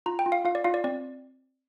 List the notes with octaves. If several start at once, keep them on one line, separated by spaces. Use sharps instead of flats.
F4 A#5
G5
F4
F5
F4 F5
D5
F4 F5
D5
C4 D5